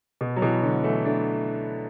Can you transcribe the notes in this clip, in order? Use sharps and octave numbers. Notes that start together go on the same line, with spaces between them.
B2
F#3
B2 E3
D3 F#3
E3 A3
A3 D4